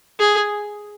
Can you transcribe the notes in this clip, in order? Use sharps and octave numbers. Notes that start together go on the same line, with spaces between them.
G#4